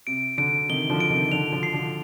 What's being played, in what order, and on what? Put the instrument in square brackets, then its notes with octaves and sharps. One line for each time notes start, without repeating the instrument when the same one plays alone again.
[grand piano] C3 [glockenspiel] D7
[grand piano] D3 [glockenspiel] D7
[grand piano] C3 D#3 [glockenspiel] G7
[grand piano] D3 F3
[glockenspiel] D7
[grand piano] C3 D#3
[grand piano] D3 [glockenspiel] F7
[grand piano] D3 F3
[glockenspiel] C7
[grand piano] D3 F3